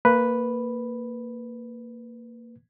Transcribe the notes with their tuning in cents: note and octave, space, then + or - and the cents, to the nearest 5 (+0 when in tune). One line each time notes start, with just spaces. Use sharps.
A#3 -15 B4 +0